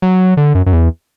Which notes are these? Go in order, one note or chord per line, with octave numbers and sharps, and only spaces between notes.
F#3
D3
F#2
F#2
E2